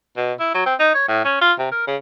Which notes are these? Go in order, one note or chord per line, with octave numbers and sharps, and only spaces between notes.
B2
E4
F#3
C4
D#4
C#5
A2
C#4
F4
C3
A#4
C#3